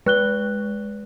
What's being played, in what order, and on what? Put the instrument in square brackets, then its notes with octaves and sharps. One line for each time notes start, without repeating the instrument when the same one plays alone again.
[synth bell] G#3 [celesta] B4 F#6 G7